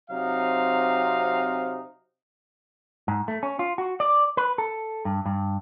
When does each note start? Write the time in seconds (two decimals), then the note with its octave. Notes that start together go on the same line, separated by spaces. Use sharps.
0.11 C3 F#3 C4 D#4 F5
3.08 G#2
3.28 A3
3.43 C#4
3.59 F4
3.78 F#4
4.00 D5
4.37 B4
4.58 A4
5.05 G2
5.26 G2